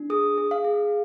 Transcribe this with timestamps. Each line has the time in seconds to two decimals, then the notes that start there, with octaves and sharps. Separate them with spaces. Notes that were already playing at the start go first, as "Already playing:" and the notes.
Already playing: D4
0.10 G#4 D#6
0.38 G#4
0.51 F5
0.64 G#4